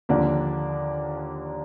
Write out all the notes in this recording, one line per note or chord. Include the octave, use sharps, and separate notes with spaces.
D#2 D3 F3 A#3 D4